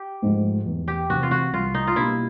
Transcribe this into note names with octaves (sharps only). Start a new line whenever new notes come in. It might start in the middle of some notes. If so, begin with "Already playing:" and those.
Already playing: G4
G#2 F3 A3
E2
G4
C3 E3 F#4
F4
F#4
C2 F4
D#4
F4
B2 G3 A#3 D4 E4